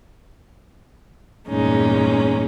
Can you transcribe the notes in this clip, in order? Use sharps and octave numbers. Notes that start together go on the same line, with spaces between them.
E2 G2 A#2 G#3 C#4 D#4